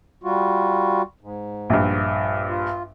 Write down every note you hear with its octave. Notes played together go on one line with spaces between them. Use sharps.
G3 F4 F#4
G#2
A#1 G2
F4